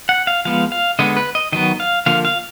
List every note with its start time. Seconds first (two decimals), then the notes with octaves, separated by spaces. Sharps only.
0.09 F#5
0.27 F5
0.45 F3 G#3 B3 F5
0.72 F5
0.99 D3 G#3 B3 D#5
1.17 B4
1.35 D#5
1.52 D#3 F#3 B3 D#5
1.80 F5
2.06 D3 F3 A#3 F5
2.25 F5